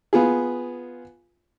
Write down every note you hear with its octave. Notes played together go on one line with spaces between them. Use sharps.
B3 F4 G#4